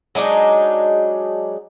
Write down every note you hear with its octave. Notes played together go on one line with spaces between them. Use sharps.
F#3 G#3 D4 D#4